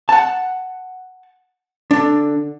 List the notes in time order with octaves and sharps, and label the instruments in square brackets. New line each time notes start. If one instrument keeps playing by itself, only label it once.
[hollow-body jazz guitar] F#5 A5
D3 D4